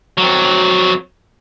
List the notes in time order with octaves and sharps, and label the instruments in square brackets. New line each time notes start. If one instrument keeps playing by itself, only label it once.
[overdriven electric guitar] F2 F#3